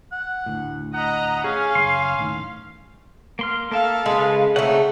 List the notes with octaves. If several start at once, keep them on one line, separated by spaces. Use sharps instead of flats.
F#5
D2 A2
D#5 F#5 A#5 B5
C#4 G#4 F5
F#1 C6
D#1 A2 D#3
A#3 C6 F6
A#3 A4 E5 F5 F6
C#3 G#3 B4
C#3 A3 C4 D#4 F#5